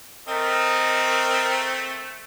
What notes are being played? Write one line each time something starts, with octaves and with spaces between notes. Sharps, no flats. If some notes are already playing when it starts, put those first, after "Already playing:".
A3 C4 A#4 D#5